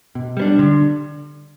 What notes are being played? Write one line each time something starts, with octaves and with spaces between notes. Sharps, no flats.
B2
G3 B3 D4
D3